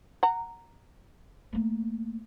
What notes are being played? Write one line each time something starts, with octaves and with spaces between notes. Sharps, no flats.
F#5 A#5
A3 A#3